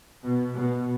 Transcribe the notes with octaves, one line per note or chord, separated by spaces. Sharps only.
B2
B2